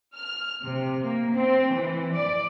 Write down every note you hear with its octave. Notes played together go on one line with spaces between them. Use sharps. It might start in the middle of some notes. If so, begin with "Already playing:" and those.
F6
C3
A#3
C4
E3
D5